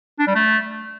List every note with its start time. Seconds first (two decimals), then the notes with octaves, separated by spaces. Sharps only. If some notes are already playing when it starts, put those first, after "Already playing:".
0.19 D4
0.27 G3
0.35 A3